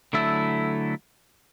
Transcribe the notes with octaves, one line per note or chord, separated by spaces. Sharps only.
D3 F#3 A3 E4 A4